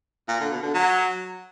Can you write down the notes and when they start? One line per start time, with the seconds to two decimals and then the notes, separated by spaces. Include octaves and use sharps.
0.28 A#2
0.40 D3
0.51 B2
0.63 D3
0.74 F#3